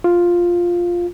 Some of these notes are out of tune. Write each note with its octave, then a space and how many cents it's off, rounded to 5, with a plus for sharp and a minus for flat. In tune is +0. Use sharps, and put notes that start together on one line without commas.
F4 +5